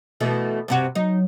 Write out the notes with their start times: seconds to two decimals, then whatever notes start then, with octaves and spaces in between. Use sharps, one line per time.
0.20 B2 E3 A3
0.68 G2 C3 F#4
0.95 F#3 D#4